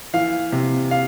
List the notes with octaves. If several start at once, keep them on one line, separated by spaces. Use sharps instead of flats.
E3 F5
C3
F5